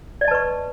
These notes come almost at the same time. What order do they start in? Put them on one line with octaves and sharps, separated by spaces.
D5 D#5 A5 B4 C#6